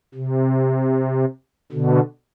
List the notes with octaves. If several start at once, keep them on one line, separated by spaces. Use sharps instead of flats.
C3
B2 D3